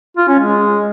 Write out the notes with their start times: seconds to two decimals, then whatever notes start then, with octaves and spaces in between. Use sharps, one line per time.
0.17 F4
0.28 C#4
0.40 G#3